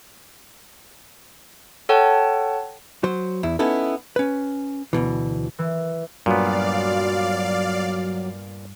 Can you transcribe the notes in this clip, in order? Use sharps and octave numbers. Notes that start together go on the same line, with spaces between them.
A4 C#5 F#5 G5 A5
F#3 C5
E2 E4
B3 C#4 D#4 E4 A4
C#4 B4
D2 B2 E3
E3
G2 A#2 F#3 B3 D5 F5